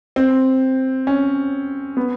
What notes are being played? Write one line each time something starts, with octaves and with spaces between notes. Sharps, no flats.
C4
C#4
B3